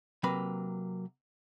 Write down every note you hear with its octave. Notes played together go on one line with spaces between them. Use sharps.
C3 F#3 A#3 B4 B5